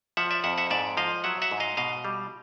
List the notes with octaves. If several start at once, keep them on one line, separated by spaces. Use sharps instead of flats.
F3 E5 F#5
D5 E5
F2 E5 F#5
E5 F#5
G#2 D5 E5
F3 D#5 F5
F#3 E5 F#5
E5 F#5
G#2
D#5 F5
B2 D#5 F5
G3